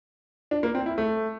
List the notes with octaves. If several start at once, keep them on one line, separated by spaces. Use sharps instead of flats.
D4
A#3
C4
E4
A3